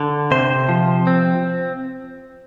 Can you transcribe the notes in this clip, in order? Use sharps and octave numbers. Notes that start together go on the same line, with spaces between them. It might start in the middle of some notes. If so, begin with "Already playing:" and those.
Already playing: D3
C3 C5
F3
C4